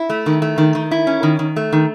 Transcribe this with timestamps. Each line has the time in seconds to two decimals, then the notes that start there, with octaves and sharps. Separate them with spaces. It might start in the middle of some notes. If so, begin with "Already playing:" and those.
Already playing: E4
0.10 A3
0.26 D#3
0.42 A3
0.58 D#3
0.75 D#3
0.91 E4
1.07 C#4
1.23 D#3
1.39 D#3
1.56 A3
1.72 D#3